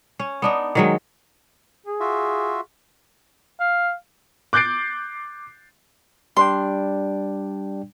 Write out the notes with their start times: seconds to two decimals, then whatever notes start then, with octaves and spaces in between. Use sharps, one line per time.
0.19 C#4
0.42 B3 D4 D#4
0.75 D#3 F#3 G#3
1.86 G#4
2.00 F4 F#4 E5
3.60 F5
4.53 D6 F#6 G6 A6 C7 D7
6.37 G3 D4 G5 C6